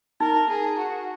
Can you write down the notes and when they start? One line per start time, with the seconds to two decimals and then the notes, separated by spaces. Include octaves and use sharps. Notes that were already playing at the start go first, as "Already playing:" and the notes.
0.20 D#4 A#4
0.49 G#4
0.78 F#4